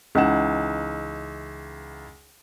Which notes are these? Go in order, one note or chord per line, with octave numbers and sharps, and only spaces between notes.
C#2 E3 D#4 F#5 E7